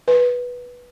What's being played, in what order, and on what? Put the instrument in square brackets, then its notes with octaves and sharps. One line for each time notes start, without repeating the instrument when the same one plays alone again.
[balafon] B4